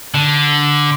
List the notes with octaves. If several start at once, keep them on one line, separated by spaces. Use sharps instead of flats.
D3